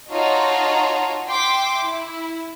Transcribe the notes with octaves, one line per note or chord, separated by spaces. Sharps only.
D#4 F4 F#4 C#5 A5 A#5
E5 G5 C6 D6
E4